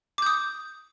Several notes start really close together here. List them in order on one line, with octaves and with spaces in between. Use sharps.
D6 G6 D#6